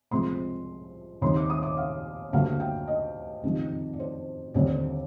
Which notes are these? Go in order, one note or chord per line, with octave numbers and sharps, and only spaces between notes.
C2 C3 F3 G#3 C4 C6
D#2 D#3 G3 C4 C6
D6
D#6
D6
F5
D2 D3 G3 A#3 F5
G5
D#5
F2 D#3 G3
D5
C5
D#2 D3 G3 C4 D5